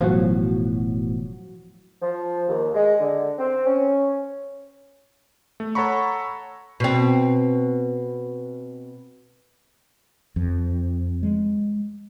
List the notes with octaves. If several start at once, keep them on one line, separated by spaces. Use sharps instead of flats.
E1 E2 A2 F3 F#3 F#4
F3
D#2
G#3
D3
C4
C#4
A3
A4 C#5 F#5 A#5 B5 C#6
B2 C4
F2
G#3